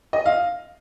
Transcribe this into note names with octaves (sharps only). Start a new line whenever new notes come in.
D#5
F5